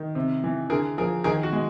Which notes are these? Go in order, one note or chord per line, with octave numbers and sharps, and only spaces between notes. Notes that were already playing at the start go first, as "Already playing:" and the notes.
Already playing: D#3
C3
E3
D3 G#4 A#4
F3 G#4 A#4
D#3 G#4 A#4
F#4
G#3